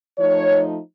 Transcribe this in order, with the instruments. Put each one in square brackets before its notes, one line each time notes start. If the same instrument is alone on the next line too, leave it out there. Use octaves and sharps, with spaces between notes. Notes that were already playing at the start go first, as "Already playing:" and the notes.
[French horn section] F3 A3 D#4 C#5